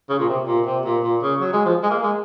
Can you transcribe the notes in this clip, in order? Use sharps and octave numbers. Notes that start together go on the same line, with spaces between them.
C#3
A#2
C3
A#2
C3
A#2
A#2
C#3
F#3
G#3
F3
G#3
A#3
G#3